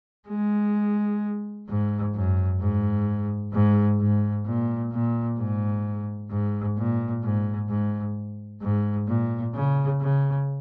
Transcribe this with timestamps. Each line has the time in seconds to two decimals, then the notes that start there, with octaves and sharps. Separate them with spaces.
0.28 G#3
1.68 G#2
2.14 F#2
2.60 G#2
3.52 G#2
4.00 G#2
4.46 A#2
4.92 A#2
5.38 G#2
6.30 G#2
6.78 A#2
7.23 G#2
7.69 G#2
8.62 G#2
9.08 A#2
9.55 C#3
10.01 C#3